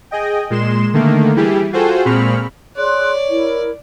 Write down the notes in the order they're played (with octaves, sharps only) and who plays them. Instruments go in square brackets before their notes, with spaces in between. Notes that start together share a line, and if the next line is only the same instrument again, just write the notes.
[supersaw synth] G#4 D#5 G5
A#2 G#3 C6 E7
D3 D#3 A3 A#3
E3 G3 E4 G4 G#4
F4 F#4 G#4 A4 C5 G5
A#2 G#3 C4 B5 C#6 F6
[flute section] G#4 C6 F#6 [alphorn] C#5 [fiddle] D5
[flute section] E4 A#4